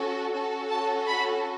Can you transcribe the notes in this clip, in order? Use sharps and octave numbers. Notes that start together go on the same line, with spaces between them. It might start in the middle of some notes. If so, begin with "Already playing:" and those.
Already playing: C#4 F#4 A4
C#4 F#4 A4
A5
B5